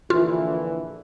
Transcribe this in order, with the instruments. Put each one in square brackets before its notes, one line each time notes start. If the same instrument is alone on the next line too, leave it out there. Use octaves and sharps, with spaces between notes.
[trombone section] A#1 D3 E3 [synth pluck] F4